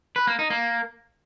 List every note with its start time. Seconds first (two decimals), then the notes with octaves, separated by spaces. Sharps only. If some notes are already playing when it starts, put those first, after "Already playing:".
0.16 B4
0.27 A#3
0.39 D#4
0.50 A#3